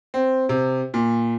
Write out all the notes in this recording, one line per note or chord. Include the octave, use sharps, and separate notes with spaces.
C4
C3
A#2